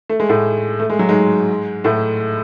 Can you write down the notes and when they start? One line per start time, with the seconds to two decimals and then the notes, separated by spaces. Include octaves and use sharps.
0.09 A3
0.20 G#3
0.30 A2 A3
0.80 A3
0.90 G#3
0.99 F#3
1.09 G#2 G#3
1.84 A2 A3